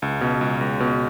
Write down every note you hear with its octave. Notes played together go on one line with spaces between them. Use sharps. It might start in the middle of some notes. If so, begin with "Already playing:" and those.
C#2
B2
C#2
C#2
B2